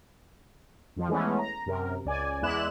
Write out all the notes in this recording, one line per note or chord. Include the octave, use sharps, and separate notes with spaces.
F2 F3
E3 G#3 A3 B3 C#4
A#5
F#2 C3 A#4
C#2 D5 G#5
E2 G#3 E4 D5 F#6 E7